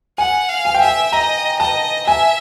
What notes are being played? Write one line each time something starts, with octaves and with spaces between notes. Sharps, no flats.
F#5 G#5
F5
G#5
G5
E5 G#5
D#5 A#5
D#5 A5
E5 G#5